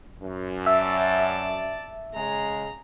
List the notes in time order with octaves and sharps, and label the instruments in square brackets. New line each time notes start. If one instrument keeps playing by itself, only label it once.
[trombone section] F#2
[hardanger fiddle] D5 A5 [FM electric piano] E5
[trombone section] C#3 G#3 G#4 [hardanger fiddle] A#5